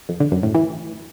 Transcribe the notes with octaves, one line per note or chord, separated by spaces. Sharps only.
F2
D3
F#2
A2
E3